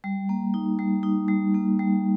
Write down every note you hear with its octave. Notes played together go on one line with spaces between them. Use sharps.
G3
A#3
D#4
G3
D#4
G3
A#3
G3